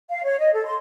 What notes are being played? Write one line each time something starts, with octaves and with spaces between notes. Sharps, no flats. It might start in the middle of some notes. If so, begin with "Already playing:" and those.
F5
C#5
D#5
A4
C6